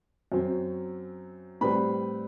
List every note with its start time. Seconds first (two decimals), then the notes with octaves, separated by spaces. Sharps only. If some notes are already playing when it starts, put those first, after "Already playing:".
0.32 F#2 F#3 C4
1.61 A2 G3 C4 B4 B5